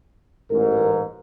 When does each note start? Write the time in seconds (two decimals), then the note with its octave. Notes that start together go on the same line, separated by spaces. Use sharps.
0.51 A1 G#2 A#4